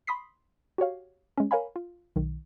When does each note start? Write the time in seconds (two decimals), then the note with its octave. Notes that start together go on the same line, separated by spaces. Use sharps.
0.07 B5 C6 D#6 B6 C7
0.78 F#4 G4 C#5 F5
1.38 G#3 C#4
1.51 A#4 C#5 F5 G#5 B5
1.76 F4
2.16 B1 D#3